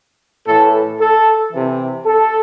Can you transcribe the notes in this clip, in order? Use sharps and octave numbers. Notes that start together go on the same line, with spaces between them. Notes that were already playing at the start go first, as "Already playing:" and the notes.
A2 E3 A4
A4
C3 E3
A4